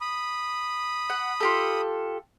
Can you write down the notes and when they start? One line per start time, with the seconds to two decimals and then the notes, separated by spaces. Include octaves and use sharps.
0.01 B5 D#6
1.10 F#5
1.40 F4 G4 A4